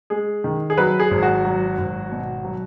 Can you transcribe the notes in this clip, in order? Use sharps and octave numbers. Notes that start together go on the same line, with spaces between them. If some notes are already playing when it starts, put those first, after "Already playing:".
G#3 G#4
D#3
G#4
F#3 B4
G#4
G#1
F#4
F#3
G#1
B2
F#3